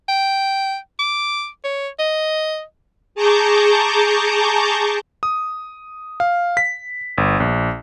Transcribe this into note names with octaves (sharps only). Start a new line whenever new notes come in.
G5
D6
C#5
D#5
G#4 A5 A#5 C#6 D6 G6
D#6
F5
B6
G1
A#1